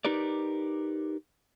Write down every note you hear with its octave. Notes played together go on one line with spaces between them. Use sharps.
D#4 G4 A#4 B4 D5